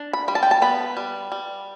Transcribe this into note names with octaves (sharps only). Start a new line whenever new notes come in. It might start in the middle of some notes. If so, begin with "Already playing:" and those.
Already playing: D4
B5
G3 B5
A5
G5
A5
B3 B5
G3
G3